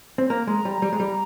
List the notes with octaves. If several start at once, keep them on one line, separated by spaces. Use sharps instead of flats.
C4
A#3 A#5
G#3
G3
G3
G#3
G3